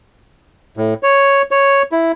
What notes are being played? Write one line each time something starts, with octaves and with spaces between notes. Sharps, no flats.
A2
C#5
C#5
E4